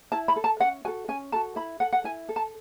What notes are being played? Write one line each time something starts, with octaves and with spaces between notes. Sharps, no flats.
E4 A5
B5
A4
A5
C#4 F#5
F#4 A4 G#5
C#4 G#5
F#4 A4 A5
E4 B5
A4 F#5
F#5
E4 G#5
A4
A5